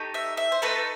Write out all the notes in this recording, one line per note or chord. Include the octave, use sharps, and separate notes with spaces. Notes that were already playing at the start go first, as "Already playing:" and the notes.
Already playing: A3 D#4 G4
E5
E5
C5
A3 D#4 A4 B4